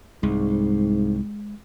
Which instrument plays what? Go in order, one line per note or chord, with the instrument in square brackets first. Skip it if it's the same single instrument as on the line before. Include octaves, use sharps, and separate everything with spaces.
[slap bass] C2 [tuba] G#2 [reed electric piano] G#3